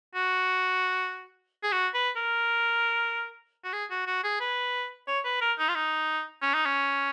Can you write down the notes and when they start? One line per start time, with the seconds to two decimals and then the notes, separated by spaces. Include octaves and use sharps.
0.15 F#4
1.63 G#4
1.72 F#4
1.94 B4
2.17 A#4
3.64 F#4
3.73 G#4
3.91 F#4
4.07 F#4
4.24 G#4
4.40 B4
5.08 C#5
5.25 B4
5.41 A#4
5.58 D#4
5.69 F4
5.75 D#4
6.42 C#4
6.54 D#4
6.66 C#4